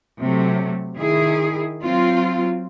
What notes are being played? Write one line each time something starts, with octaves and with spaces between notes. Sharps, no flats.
C3 F#3 A3
D#3 E4 G#4
F#3 C4 F4